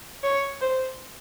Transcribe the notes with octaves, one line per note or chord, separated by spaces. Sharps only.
C#5
C5